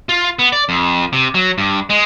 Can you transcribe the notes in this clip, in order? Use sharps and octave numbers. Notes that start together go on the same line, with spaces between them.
F4
B3
D5
F2
C3
F#3
G2
G#3